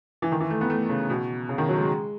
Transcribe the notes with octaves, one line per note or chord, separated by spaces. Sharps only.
E3
D#3
E3
A3
B3
A3
C#3
B2
C#3
D#3
F#3
G#3